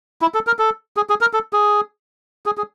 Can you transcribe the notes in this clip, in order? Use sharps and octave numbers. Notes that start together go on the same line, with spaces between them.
E4
A4
A#4
A4
G#4
G#4
A#4
A4
G#4
G#4
G#4